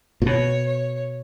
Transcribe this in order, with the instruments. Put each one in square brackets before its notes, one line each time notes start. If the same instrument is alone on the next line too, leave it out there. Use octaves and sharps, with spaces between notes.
[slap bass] A#2
[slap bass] B2 [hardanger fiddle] C#5
[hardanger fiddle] C#5